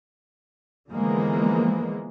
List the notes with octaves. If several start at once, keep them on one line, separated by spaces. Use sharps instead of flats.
D3 E3 F3 G#3 A#3 B3